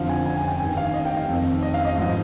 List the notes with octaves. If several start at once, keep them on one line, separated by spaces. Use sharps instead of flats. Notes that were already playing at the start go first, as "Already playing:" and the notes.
Already playing: F2 D3 F3 F5
G#5
G#5
G#5
G5
G2 D#3 G#5
F5
D#5
G5
F5
F2 D#3
D#5
F5
D#5
G#2 F3